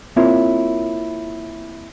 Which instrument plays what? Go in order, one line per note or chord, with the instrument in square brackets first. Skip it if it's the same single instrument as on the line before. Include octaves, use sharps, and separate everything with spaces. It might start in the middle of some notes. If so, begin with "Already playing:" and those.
[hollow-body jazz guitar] A#3 C4 E4 F4 A#4 C#5